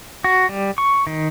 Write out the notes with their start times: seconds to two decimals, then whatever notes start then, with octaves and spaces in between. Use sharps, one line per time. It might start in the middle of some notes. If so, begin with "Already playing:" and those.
0.24 F#4
0.49 G3
0.78 C#6
1.07 D#3